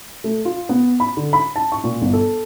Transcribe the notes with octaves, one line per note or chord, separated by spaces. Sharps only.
A3
F4
B3
B5
D3
B5
A5
C#6
A#2
G1
A4